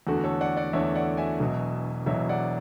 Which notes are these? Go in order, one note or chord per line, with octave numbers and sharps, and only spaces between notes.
E2 D3 A3 F#4
A4 C#5
D5 F#5
D5 F#5
E2 D3 A3 C#5 E5
D5 F#5
E5 G#5
E1 E2 B2 F#3
E1 E2 B2 F#3 C#5 E5
D5 F#5